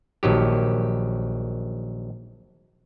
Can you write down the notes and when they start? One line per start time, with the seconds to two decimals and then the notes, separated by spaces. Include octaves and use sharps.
0.23 A#1 D#3 F#3 G4